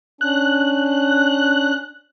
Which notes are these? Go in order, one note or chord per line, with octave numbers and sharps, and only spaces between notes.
C#4 D4 F#6